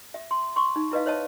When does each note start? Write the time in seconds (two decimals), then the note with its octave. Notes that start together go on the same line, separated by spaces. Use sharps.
0.14 E5
0.31 C6
0.56 C6 C#6
0.76 D#4
0.92 E4 B4 D#5 F5
1.06 C5 C#5 D#5 E5 A5